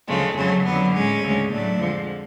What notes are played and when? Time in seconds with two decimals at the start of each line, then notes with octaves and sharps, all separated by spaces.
0.08 D2 C#3 F3 G#3 A3
0.36 F2 C#3 F#3 A3
0.65 F2 D3 F#3 B3
0.94 A2 G#3 C#4
1.23 D2 C#3 G#3
1.51 A2 F#3 A3 D4
1.79 F2 D3 F3 G#3